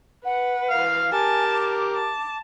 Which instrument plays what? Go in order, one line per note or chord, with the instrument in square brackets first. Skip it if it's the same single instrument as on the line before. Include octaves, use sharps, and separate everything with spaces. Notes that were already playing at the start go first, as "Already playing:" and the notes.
[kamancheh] B4 [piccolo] F#5
[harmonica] E3 F5 F6
[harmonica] G4 A#4 [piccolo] G#5 [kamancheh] A5
[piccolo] D6
[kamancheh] A5